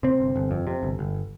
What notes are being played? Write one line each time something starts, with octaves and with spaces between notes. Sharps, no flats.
C3 C4
G1
G1
F2
C3
G1
G1